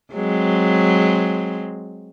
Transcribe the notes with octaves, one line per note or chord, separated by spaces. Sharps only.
F#3 G#3 C4